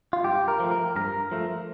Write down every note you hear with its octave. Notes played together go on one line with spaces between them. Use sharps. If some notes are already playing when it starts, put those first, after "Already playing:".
F4
G2 G4
A#4
F3 A3
A#4
G2 A#4
F3 A3